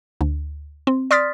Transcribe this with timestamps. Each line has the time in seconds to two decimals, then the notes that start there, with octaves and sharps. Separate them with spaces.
0.21 D2
0.87 C4
1.11 D5 C6 D#6 F6 A6 B6